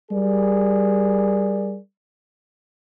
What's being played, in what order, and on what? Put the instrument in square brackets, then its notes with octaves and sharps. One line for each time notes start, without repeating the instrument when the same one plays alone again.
[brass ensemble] G3 G#4 A#4 D5